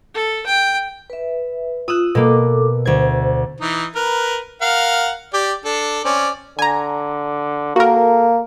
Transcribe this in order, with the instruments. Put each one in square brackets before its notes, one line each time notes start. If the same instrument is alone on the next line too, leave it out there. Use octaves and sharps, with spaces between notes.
[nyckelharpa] A4
G5
[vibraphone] B4 E5
[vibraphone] F4 [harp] D#6 E6 F#6
[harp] B2 A#3 [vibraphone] A4 D6
[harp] D2 G#6 [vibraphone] C5
[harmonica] E3 D#4
A#4 B4
A#4 F5 F#5
G4 D5
D4 A4
C4 C#4 D5
[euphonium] D3 [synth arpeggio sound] G#5 A#5
[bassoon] A#3 [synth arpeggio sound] F#4 A#4 [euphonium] A4